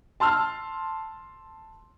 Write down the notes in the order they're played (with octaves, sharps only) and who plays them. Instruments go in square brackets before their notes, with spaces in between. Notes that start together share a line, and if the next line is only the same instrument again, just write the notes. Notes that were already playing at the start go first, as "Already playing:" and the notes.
[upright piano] A5 C6 E6 F6